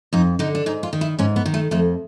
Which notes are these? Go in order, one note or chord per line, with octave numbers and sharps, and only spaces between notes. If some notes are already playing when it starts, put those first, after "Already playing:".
F2 D#4
D3 D#4
D4
G#2 D#4
F4
D#3
E4
G#2 C#4
B3
D#3
A3
F2 A3